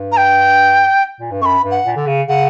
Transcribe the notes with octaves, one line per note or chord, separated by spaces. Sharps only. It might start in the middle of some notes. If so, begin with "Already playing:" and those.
Already playing: G2
A#5
G5
A#2
G2
F#2 B5 C#6
G2
F#5
A#2
D3
C#3
C#3 F#5